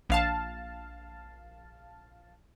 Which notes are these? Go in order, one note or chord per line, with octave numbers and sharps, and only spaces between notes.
A#1 F5 A5